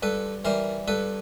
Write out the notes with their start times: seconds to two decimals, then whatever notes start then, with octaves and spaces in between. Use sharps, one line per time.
0.03 G2 A4 B4
0.45 E3 G3 A#4 C5
0.88 G2 A4 B4